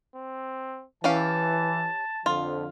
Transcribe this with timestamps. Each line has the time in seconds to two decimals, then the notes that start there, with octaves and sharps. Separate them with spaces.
0.15 C4
1.04 E3 C#4 G4 F5 A5
2.26 F2 D3 F3 F4